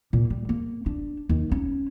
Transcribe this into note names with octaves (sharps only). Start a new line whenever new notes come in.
A#2
G3
A#3
D4
D#2
C#4